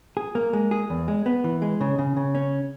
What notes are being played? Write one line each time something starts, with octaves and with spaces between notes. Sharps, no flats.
G#4
A#3
G#3
G#4
E2
G#3
B3
E3
G#3
C#3
C#3
C#3
C#4